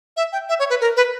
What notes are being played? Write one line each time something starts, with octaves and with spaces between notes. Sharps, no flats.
E5
G5
E5
C#5
B4
A#4
B4